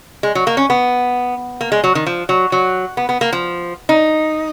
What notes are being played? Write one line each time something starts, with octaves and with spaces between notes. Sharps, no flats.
G#3
F#3
A#3
C#4
B3
A#3
G#3
F#3
D#3
F3
F#3
F#3
B3
B3
A#3
F3
D#4